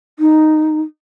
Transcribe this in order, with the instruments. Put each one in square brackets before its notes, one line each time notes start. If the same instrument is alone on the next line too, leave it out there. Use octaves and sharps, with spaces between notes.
[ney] D#4